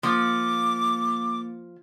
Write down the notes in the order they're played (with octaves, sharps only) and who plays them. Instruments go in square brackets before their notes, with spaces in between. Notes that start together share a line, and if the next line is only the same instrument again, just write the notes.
[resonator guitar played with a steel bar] F3 [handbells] A#3 A6 C#7 [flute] D6